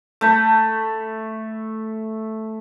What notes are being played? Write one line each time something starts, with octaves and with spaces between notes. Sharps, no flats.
A3 B5